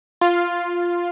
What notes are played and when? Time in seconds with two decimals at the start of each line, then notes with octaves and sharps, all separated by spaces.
0.21 F4